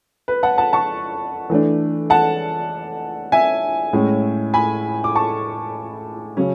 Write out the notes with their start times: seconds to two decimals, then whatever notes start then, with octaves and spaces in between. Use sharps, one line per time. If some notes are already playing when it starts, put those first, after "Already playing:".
0.28 B4
0.43 F#5 A5
0.58 F#5 A5
0.73 A5 C#6
1.50 E3 A3 D4
2.10 F#5 A5
3.32 E5 G#5
3.93 A2 G#3 C#4
4.54 G#5 B5
5.04 D6
5.15 A5 C#6
6.37 C#3 F#3 C#4